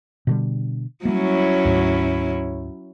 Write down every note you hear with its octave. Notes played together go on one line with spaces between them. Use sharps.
B2 D3 G3
F#3 G3 A#3 C#4 E4
D2 G#2